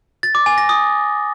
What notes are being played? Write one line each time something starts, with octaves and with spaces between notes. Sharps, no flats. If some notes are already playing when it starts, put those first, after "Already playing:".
A6
D6
G#5
A#6
D#6